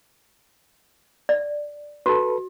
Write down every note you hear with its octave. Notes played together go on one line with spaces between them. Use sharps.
D5
F#4 A4 B4